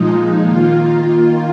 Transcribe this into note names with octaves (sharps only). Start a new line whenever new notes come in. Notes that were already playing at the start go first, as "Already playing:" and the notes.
Already playing: A#2 F3 G#3 D#4
D#3 A#3 F4